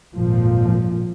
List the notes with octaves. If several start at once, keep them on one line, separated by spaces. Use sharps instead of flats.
G#1 F2 A#2 F3